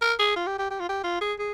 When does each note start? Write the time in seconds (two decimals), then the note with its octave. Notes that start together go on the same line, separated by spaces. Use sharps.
0.01 A#4
0.19 G#4
0.36 F4
0.46 G4
0.58 G4
0.70 G4
0.80 F4
0.89 G4
1.04 F4
1.21 G#4
1.39 G#4